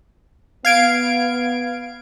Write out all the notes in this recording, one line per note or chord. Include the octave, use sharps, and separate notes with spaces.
B3 F5 G#6 D7